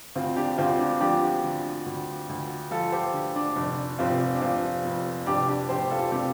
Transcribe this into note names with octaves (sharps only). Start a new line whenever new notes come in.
D2 C4 F4
D4 G4
D2 C4 F4
D4
F3 D4 G4
D3
D2
D2
F3 F4 A4
G4 C5
D3
D4
F1 D4
F1 C4 F4
D4
C3 C4 F4
F2
F1 D4 G4
D4 G4
F1 G4 C5
F4 A4
C3 D4 G4